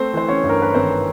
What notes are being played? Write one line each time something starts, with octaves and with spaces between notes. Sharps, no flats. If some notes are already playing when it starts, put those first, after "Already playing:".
Already playing: A3 C4 C5
E3 C5
C#4 C#5
G2
A#4
B4
G#1 C4 C5